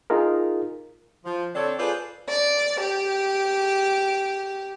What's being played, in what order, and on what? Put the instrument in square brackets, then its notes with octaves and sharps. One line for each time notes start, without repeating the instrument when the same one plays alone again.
[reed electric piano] D#4 F4 G#4 A#4
[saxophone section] F3
D3 C4 D4 A4 C#5
F4 G#4 A4 B4 C5 D5
[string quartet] D5
G4